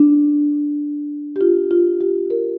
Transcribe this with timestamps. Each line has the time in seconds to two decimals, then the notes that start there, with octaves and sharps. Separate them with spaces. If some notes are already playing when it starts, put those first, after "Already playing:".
Already playing: D4
1.36 G4
1.41 F4
1.71 F4
2.01 G4
2.30 A#4